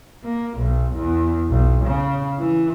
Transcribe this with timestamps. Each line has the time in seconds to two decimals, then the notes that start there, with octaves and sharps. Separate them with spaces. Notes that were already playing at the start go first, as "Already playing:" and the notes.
0.24 A#3
0.58 B1
0.95 E2
1.50 B1
1.85 C#3
2.39 E3